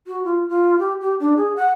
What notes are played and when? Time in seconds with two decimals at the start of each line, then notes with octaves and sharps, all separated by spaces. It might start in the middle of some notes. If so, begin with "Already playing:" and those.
0.07 F#4
0.24 F4
0.49 F4
0.79 G4
1.01 G4
1.20 D4
1.37 G#4
1.56 F#5